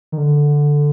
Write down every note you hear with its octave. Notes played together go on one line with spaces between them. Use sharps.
D#3
D3